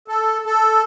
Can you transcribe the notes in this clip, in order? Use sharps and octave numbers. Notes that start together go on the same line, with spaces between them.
A4
A4